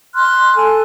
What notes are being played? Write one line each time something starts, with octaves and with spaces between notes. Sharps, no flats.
C6 F6 F#6
A4 G#5